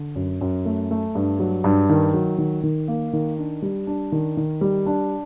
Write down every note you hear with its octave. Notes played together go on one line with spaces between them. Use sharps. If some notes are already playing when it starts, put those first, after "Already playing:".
Already playing: D3
F#2
F#2
A3
A3
G2
F#3
G2
D#3
F#3
D#3
D#3
A#3
D#3
D4
G3
D4
D#3
D#3
G3
D4